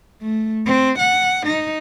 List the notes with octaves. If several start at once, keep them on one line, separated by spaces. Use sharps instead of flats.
A3
C4
F#5
D#4